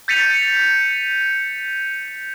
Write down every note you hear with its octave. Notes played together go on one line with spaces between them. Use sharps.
G6 A6 B6 C#7 D#7 F7